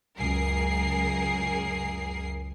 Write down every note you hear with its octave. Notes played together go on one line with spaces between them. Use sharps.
C#2 F#2 G#4 A#4 C7